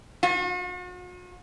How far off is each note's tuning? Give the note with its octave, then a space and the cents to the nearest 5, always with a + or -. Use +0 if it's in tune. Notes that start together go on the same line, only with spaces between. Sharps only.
F#4 -45